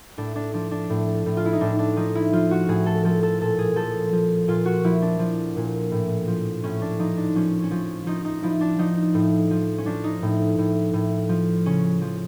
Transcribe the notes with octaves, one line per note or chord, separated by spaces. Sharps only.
A2 D4
D4
F3 D4
D4
A2
A2
F4
E4
D#4
A2 D4
D4
F3 D#4
E4
F3 F4
F#4
A2 G#4
A4
F3 A4
A4
A#2 A4
G#4
F3 A4
F3
A#2 F4
F#4
F3 E4
D4
F3
A#2
A2
F3
A2 C#4
D4
F3 D#4
D4
F3 C#4
C#4
F3
F3 D#4
D#4
F3 E4
D4
F3 D#4
A2
F3
C#4
F3 D4
D#4
A2
A2
A2
F3
C#3 C#4
F3